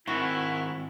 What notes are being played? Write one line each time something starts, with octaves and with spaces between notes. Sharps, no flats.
G#2 D#3 C4 E4 F#4